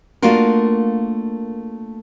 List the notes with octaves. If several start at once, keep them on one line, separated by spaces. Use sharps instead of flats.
A3 A#3 D4 F4 F#4 A#4